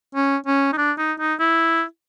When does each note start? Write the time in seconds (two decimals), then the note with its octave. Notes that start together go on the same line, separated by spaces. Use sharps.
0.15 C#4
0.46 C#4
0.72 D#4
0.77 D4
0.98 D#4
1.20 D#4
1.39 E4